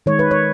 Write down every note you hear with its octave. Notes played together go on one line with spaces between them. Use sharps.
D#3 G#3 C#5
B4
C#5